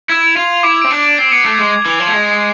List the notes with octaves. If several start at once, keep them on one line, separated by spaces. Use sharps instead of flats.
E4 G#6
F7
F4
F7
E4 D6
C4 D7
D4
D7
C4 C7
B3 C7
A3
G#3 G#6
G#6
E3 F7
F3
A3 G#6
G#3
C7